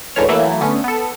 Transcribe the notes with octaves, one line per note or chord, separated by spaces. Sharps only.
C#2 G#2 D3 E3 C#5 F6
E3 F#3 A3 A#3 E4
D3 A3 B3 C#4
B3 A4